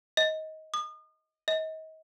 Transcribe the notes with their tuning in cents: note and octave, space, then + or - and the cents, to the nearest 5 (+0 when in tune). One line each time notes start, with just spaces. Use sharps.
D#5 +20
D#6 -35
D#5 +35